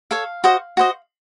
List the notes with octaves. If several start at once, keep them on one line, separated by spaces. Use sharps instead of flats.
A4 C#5 F5
F#4 C5 D#5
F#4 C5 D#5